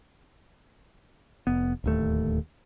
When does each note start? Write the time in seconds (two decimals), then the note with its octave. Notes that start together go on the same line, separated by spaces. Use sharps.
1.47 F1 B3
1.84 D1 D#2 A3